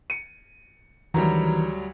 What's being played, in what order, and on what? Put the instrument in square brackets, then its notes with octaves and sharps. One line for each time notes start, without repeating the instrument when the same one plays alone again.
[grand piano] C#7 D#7
[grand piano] D2 F#3 G3 [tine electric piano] D#3 E3 A#5